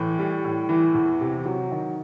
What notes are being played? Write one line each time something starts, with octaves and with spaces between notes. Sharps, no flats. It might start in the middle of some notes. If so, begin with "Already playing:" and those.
Already playing: A2 E3
G3
A2
E3
E2
C3
F#3
D#3